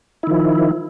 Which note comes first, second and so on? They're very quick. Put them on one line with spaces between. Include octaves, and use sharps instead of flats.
E4 D#3 F3